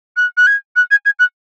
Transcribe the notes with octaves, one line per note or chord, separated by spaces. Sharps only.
F#6
F#6
G#6
F#6
G#6
G#6
F#6